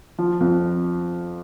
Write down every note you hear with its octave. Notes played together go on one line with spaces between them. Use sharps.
F3
F2